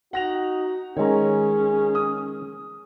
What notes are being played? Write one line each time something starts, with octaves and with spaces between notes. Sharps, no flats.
D#4 F#4 F#5 A#6 F7
D#3 G#3 C#4 G#4 C#5 A#5
D#6